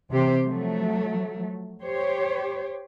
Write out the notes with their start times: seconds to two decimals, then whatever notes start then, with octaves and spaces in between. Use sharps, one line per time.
0.10 C3 E3 G4 C5
0.43 F3 F#3 A3
1.81 G4 C5 C#5